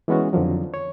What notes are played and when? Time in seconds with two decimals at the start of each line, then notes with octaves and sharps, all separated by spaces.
0.08 E3 G#3 B3 C#4 F#4
0.33 F2 D3 D#3 F3 F#3
0.74 C#5